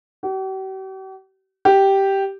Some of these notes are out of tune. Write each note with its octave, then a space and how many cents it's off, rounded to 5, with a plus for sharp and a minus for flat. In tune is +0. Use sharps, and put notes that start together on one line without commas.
G4 -45
G4 -5